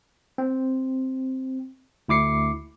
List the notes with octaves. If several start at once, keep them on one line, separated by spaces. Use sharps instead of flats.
C4
D2 E4 D6 C7 C#7